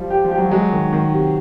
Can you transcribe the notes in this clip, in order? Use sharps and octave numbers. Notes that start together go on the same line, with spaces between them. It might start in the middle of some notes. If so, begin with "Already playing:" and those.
Already playing: F3 G3
G4
F3
G4
F#3
F#3 G#3
D#3
D#3
C3